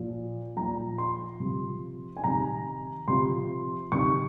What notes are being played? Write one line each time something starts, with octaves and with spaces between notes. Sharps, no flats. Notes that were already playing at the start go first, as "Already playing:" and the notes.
Already playing: A#2 F3
A#2 F3 A#5
C6
C3 F3
G#5
C3 D#3 A#5
C3 F3 C6
C3 D#3 C#6